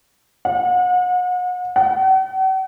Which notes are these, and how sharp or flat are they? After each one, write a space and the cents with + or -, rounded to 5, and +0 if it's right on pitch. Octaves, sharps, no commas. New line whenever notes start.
F#5 -35
F#5 +45